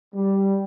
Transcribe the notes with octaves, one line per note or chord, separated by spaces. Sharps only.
G3